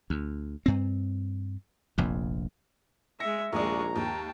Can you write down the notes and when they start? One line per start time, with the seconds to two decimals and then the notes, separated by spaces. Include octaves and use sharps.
0.10 D2
0.66 G2 C4
1.98 F1 A#1 F2
3.20 G#3 E5 A#6 C#7
3.53 A#1 D#2 G#3 D5 A#5 C#6
3.96 D#2 G5 A5